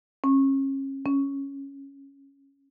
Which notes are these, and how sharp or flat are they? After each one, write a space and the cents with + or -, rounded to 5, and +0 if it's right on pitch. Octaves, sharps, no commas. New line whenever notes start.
C#4 -35
C#4 -5